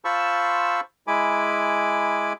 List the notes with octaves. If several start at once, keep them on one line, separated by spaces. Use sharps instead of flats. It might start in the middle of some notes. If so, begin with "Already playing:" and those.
F4 C5 A5 B5 C#6 E6
G#3 E4 G#5 B5 D6